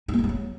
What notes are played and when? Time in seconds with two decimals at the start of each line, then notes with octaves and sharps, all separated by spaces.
0.08 D#4
0.14 A#3
0.19 D#4
0.24 G#3
0.29 F#3